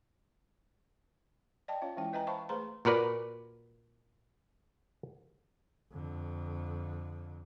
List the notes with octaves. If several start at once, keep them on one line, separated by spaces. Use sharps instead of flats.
D5 D#5 G5 A5
C#4 F4 C#5 F5
E3 G#3 C#4 E4 G5
B4 D#5 E5 G5 G#5 A#5
C5 E5 F5 A5 B5 C#6
A3 G#4 B4 C5 A#5 C6
A#2 F#4 A#4 B4 D5
F2 D3